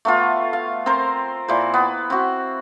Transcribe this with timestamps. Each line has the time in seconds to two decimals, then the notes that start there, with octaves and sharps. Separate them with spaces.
0.05 A3 B3 F4
0.53 F5
0.86 C4 A#4 C5 C6
1.48 A#2 E4 C5
1.74 B3
2.10 C4 F#4